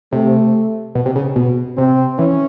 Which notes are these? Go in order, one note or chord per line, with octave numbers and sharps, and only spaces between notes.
C3 A3
B2
C3
C#3
B2
C3 C4
E3 C#4